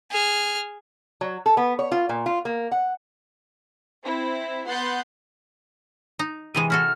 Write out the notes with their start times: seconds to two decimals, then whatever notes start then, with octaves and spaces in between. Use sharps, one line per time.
0.11 G#4 F6
1.21 F#3
1.46 A4
1.57 B3
1.79 C#5
1.92 F4
2.09 A#2
2.26 F4
2.45 A#3
2.71 F#5
4.02 C4 E4
4.66 B3 F#5 C6 F#6 G6 A6
6.19 D#4
6.55 C3 E3 G#3 D#7
6.70 E4 F#4 A4 F6